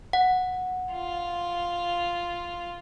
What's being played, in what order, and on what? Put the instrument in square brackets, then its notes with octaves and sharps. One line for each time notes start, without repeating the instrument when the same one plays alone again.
[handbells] F#5
[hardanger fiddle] F4